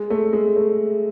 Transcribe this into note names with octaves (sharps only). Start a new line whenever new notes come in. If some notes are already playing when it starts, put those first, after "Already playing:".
Already playing: G#3
A3
G#3
A3